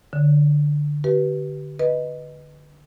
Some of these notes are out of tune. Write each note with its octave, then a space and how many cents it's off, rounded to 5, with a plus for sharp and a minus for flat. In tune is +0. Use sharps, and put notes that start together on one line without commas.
D3 +5 C#5 +20
G4 -35 B4 -20
B4 +0 D#5 +0